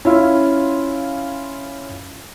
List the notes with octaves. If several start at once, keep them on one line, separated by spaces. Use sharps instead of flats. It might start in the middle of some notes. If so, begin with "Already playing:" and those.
C#4 E4 F4